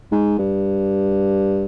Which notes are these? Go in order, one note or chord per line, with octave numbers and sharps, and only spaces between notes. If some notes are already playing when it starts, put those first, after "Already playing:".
G#2
G2